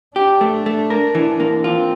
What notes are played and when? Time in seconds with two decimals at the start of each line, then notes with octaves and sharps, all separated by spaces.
0.16 D4 G4
0.41 A3
0.66 A3
0.90 A#4
1.15 E3
1.40 A#3
1.64 C4 F4